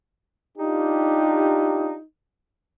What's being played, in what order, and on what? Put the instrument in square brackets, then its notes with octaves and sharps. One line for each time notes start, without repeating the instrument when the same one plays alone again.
[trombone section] D4 F4 G4 [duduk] D#4